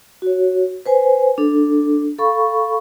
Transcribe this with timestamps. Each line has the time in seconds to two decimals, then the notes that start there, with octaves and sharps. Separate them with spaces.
0.22 F#4 C#5
0.86 B4 C5 G#5
1.38 D4 A4
2.18 A4 F5 B5 C#6